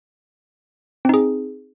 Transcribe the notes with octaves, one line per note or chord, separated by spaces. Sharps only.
C4 D#4 G#4